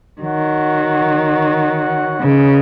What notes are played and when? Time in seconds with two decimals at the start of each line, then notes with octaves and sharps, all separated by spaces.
0.21 D#3 F#4 C#5 F#5
2.21 C#3 C#4 B4 D#5